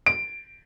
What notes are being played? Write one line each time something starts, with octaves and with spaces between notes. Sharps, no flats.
D7